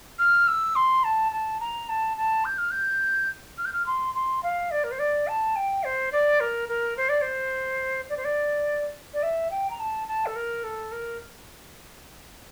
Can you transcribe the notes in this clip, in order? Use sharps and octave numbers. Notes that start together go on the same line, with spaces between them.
F6
E6
C6
A5
A5
A#5
A5
A5
G6
F6
G6
F6
G6
F6
C6
C6
F5
D5
A#4
C5
D5
A5
G5
C5
D5
A#4
A#4
C5
D5
C5
D5
C5
D5
D5
E5
G5
A#5
A5
A5
A4
A#4
A4
A#4